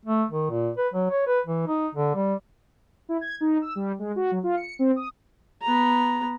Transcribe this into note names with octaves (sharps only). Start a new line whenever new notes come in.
A3
D#3
A#2
B4
F#3
C#5
B4
E3
D#4
D3
G3
E4
G#6
D#4
E6
G3
G#3
F#4
F#3
F4
C#7
C4
D#6
B3 A#5